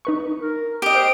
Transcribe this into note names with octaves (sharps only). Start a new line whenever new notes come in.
D#4 B4 C#6
A#4
G4 D#5 D7
C5